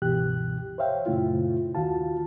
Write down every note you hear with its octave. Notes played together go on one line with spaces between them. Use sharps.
C#2 G2 B2 E3 G4 F#6
C5 C#5 E5 F5 G5
F#2 A#2 C#3 A3 E4 F4
D#2 D#3 F4 F#4 F5 A5